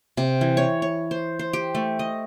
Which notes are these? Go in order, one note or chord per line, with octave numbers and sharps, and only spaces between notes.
C3
E3
C#5
C#5
C5
C5
G4
A3
D#5